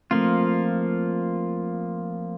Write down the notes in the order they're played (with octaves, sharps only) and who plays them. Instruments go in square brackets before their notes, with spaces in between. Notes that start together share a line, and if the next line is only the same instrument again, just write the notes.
[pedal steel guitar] F3 A#3 F4 [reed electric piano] A3 C4